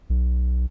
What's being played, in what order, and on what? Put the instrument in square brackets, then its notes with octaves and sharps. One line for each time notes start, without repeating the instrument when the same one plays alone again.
[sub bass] B1